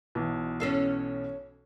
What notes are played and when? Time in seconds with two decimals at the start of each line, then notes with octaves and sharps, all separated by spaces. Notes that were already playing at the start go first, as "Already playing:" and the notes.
0.15 B1 B2 E3
0.60 C#4 A4 F5